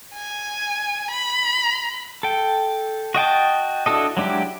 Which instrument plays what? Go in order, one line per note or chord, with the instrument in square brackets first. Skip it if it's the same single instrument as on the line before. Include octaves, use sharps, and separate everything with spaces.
[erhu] G#5
B5
[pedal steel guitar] A4 G5
F#4 D#5 G5 A5
D4 E4 F#4 A4 D#5
F#3 G#3 D4 E4 G4